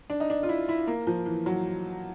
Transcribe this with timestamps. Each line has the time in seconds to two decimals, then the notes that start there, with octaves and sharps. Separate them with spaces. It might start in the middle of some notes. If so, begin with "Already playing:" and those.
0.10 D4
0.20 D#4
0.30 D4
0.43 F4
0.49 E4
0.69 E4
0.87 A#3
1.07 F3
1.26 E3
1.46 F#3